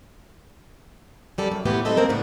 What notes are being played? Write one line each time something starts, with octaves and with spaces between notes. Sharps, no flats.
F#2 G3 A4
F#2
D2 A2 E3 B3 E4 G4
F#3 G3 C4 A4 D#5 E5
A#3 C4 A#4
A2 C#3 B3 D4